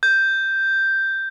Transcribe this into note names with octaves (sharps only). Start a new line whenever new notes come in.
G6